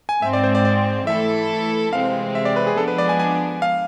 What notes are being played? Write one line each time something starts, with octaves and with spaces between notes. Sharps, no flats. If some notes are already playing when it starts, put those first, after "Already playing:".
G#5
G#2 G#3 C4 E5
D5
C5
D5
D5
E3 A3 E4 A4 E5
C3 E3 G#3 C4 F5
E5
D5
B4
G#4
F3 G#3 B3 D4 A4
B4
D5
G#5
G#5
F5